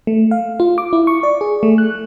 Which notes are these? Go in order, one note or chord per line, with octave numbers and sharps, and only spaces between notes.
A3
F5
F4
D6
E4
C#6
D5
G#4
A3
F#6